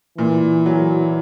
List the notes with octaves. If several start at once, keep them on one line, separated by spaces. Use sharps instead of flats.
A#2 E3
F#3